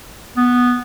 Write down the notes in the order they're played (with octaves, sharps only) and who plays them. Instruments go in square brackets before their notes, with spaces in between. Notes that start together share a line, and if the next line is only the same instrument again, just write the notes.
[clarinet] B3